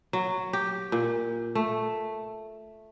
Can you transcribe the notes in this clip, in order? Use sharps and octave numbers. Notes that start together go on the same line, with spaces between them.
F#3
G4
A#2
A3